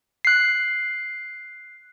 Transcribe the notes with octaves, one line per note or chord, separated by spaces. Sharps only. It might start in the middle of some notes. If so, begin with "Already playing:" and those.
F#6 C7